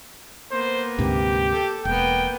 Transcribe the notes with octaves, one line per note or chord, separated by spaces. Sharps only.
A#3 B3 C5
D2 G#2 C3 G4
A4
E1 A#3 B3 G5